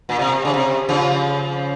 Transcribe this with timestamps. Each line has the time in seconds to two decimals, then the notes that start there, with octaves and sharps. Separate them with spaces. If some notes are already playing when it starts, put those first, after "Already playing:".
0.09 A#2
0.19 C3
0.45 C#3
0.54 C3
0.89 C#3 F3